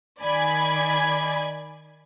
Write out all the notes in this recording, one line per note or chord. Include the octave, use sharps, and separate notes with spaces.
D#3 D5 G#5 B5 G#6